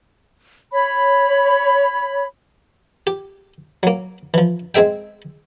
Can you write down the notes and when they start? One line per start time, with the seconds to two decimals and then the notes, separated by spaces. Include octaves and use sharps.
0.72 C#5 B5
3.07 G4
3.83 F#3 A#3
4.34 E3 F3
4.75 G#3 C4 G#4 E5 G5